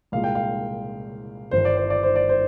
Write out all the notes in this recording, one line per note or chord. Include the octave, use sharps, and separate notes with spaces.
C2 A#2 G#3 F5
G5
F5
G1 G2 D#3 C5
D5
C5
D5
C5
D5
C5